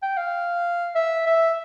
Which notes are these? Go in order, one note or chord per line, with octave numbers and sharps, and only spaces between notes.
G5
F5
E5
E5